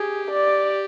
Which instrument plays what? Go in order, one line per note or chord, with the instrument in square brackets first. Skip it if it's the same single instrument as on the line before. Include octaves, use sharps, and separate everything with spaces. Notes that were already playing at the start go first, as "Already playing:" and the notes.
Already playing: [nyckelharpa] G4 [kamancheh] G#4
[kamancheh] D5